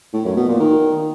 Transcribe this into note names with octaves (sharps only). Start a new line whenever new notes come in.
A2
F#2
B2
A#2
D#3